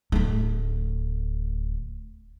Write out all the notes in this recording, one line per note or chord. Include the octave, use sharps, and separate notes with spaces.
D1 A3